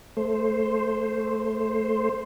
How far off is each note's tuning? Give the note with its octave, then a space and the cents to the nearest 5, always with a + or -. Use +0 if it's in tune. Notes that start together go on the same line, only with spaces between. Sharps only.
A3 +0 C5 +0